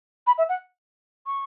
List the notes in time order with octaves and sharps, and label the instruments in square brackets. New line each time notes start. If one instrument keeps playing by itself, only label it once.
[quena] B5
E5
F#5
C#6